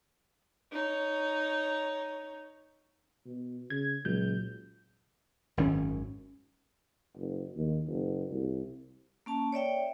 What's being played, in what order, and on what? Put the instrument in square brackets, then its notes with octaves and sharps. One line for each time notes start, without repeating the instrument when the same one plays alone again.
[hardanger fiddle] D#4 C#5
[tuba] B2
[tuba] C#3 [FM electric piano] G#6
[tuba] C#2 [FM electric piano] A#2 F#3 G6
[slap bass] G#1 F#2 D#3 C#4
[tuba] F#1
D#2
F#1
C2
[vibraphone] A#3 C#4 A5
C#5 D5 E5 G5